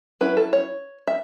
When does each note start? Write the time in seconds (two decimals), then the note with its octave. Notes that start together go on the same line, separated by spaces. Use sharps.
0.21 F#3 C#4 E4 B4
0.37 A4
0.53 C#5
1.07 E5